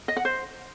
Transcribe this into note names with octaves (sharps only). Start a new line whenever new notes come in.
D#5
F#5
C5